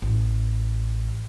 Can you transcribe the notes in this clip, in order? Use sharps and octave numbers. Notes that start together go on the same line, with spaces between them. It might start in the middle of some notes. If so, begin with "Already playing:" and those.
A1